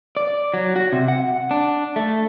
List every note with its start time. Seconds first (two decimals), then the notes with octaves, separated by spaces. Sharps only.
0.17 D5
0.54 F#3
0.76 F#4
0.93 C3
1.08 F#5
1.51 D4
1.96 A3